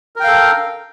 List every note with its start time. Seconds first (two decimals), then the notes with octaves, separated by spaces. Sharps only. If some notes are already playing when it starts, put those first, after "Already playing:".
0.16 A#4
0.20 G5
0.24 F5
0.28 A4